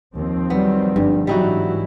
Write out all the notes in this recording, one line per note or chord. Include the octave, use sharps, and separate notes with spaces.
D#2 D#3 F3 C4
F#3 G3 B3
G1 G2 G3
G#2 E3 F#3 G3 D#4 E4 F#4